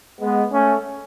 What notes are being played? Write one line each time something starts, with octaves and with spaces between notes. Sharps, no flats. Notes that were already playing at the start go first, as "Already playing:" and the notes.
G#3 B3
A3 C#4